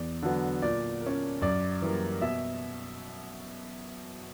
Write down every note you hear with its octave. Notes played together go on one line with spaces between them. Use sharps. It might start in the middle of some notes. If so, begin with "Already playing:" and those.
Already playing: E2 D5
D3 F#3 B3
A#2 D5
A#3 C#4
F#2 D5
E3 G3 A#3
B2 E5